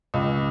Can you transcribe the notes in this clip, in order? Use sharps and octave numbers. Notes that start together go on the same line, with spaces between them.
C#2